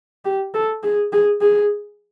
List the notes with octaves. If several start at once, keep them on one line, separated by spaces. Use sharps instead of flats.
G4
A4
G#4
G#4
G#4